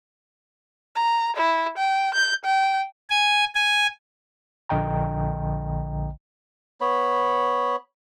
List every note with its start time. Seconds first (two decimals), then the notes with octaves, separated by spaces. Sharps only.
0.96 A#5
1.37 E4
1.78 G5
2.14 G6
2.45 G5
3.10 G#5
3.55 G#5
4.69 A#1 D3 D#5 G5 A#5
6.81 B3 C#5 B5